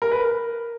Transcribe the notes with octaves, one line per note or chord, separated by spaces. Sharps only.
A#4
B4
A#4